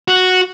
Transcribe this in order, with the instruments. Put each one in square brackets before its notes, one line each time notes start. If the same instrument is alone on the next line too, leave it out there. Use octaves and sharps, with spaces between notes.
[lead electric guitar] F#4